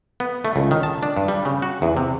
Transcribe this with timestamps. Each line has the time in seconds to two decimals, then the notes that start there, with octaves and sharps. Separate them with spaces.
0.20 B3
0.45 A3
0.56 C#2
0.71 D#3
0.83 A5
1.03 D4
1.17 G2
1.28 G3
1.45 C#3
1.62 F#4
1.82 E2
1.97 C3